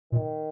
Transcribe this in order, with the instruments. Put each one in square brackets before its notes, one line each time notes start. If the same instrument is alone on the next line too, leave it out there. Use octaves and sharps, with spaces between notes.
[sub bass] A#2 [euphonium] D#3